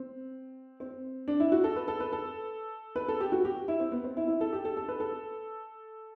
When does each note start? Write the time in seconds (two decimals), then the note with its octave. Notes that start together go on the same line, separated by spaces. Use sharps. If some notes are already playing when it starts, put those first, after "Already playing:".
Already playing: C4
0.80 C4
1.28 D4
1.40 E4
1.52 F#4
1.64 A4
1.76 B4
1.88 A4
2.00 B4
2.13 A4
2.96 B4
3.08 A4
3.21 G4
3.32 F#4
3.45 G4
3.68 E4
3.80 C4
3.92 B3
4.04 C4
4.17 E4
4.28 E4
4.41 A4
4.53 G4
4.65 A4
4.77 A4
4.88 B4
5.00 A4